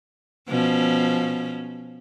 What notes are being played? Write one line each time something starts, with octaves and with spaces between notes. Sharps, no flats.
B2 F3 C#4